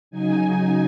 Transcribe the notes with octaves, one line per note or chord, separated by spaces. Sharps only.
C#3 F#3 D#4 G#5